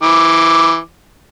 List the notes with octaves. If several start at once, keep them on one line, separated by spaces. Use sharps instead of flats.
E3 D6